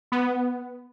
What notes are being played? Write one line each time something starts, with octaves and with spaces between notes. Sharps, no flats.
B3